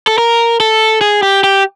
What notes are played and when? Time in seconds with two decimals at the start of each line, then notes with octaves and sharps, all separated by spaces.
0.07 A4
0.18 A#4
0.60 A4
1.01 G#4
1.23 G4
1.44 G4